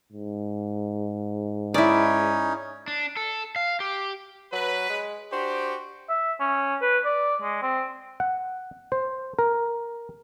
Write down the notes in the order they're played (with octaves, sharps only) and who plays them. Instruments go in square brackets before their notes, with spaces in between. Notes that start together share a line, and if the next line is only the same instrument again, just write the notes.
[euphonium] G#2
[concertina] C#4 D#4 [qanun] E4 D5
[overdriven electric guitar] D4
A4
F5
G4
[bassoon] F#3 [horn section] B4
[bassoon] G#3
[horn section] D4 F#4 G4 [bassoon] C5
[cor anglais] E5
C#4
B4
D5
G#3
C4
[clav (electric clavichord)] F#5
C5
A#4